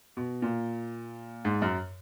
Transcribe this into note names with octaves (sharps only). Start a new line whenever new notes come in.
B2
A#2
G#2
F#2